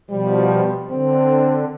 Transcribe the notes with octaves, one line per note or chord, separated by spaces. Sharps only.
B2 F3 G3
D3 C4